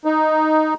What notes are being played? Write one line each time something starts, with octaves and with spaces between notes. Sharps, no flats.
D#4